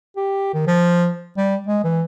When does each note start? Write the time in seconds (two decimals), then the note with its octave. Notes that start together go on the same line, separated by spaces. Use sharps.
0.17 G4
0.54 D#3
0.67 F3
1.38 G3
1.67 G#3
1.84 E3